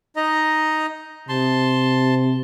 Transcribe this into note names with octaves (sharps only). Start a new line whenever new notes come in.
D#4 D#5 A#5
C3 A5 C6